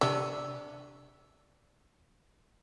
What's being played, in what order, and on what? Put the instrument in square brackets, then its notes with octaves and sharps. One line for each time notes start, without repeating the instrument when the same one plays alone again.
[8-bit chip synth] C3 E6 [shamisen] D4